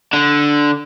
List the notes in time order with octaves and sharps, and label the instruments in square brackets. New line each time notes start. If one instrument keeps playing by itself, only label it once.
[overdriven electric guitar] D3